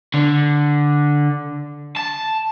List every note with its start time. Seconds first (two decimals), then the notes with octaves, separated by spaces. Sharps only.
0.14 D3
1.96 A5